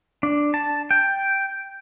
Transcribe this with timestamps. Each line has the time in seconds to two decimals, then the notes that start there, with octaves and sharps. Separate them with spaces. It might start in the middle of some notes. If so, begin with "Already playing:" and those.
0.23 D4
0.54 A5
0.91 G5